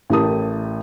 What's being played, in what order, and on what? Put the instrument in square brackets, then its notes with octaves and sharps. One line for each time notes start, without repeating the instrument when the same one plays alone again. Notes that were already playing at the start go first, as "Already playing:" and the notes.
[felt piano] A1 A2 G4 A#4 A5 D#6